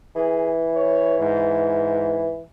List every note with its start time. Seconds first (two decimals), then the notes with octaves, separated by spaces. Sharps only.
0.16 E3 G#4
0.74 C#5
1.18 G#2